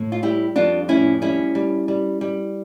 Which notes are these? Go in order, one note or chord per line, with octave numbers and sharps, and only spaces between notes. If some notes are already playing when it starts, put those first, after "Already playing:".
Already playing: A2
F4
G3 E4 G4
F2 D4 F4
A2 C#4 E4
G3 C#4 E4
G3
G3
G3